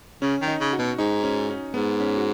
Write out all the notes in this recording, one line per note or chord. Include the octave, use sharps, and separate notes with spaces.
C#3 C#4
D#3
D#4
C#3
F#4
B2
G#2 D#4
C#4
C#4
G#2 B3
C#4
F#4